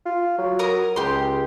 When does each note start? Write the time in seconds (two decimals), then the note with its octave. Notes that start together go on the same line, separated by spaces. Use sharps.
0.06 F4
0.39 F#3
0.59 A#4 A#5 D#6
0.96 C#2 G4 C6